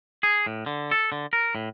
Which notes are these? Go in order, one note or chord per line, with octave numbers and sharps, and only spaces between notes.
G#4
A2
D3
A4
D3
A#4
A2